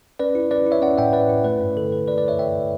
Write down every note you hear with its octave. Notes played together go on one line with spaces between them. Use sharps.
C#4 B4 D5
E4
C#4 B4 D5
E4
C#5 E5
C#4 D5 F#5
A2 E5 G5
A2 B4 D5
E4
A3 B4
G2
D3 A4
G2 B4
G2 B4 D5
B4 D5
G2
C#5 E5
G2 E5 G5